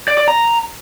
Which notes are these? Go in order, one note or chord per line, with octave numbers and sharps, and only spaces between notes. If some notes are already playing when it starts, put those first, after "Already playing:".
D5
D5
A#5